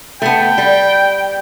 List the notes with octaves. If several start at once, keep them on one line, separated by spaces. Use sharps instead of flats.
A3 B3 G5
G3